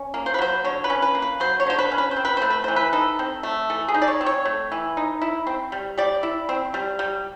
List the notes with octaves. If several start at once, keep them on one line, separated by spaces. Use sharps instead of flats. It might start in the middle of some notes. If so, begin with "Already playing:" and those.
Already playing: C#4
A#3
C5
B4
F#3 C5
D3 C#5
B4
C#4
B4
A#3
B4
F#3 C5
C#5
D3 C5
B4
C#4
B4
C5
C4
B4
A3 C5
B4
E3 C5
B4
D#4 A4
C4
A3
E3 A4
G#4
D#4
D5
C#5
C4
C#5
A3
E3
D#4
E4
C4
G3
G3 D5
E4
C4
G3
G3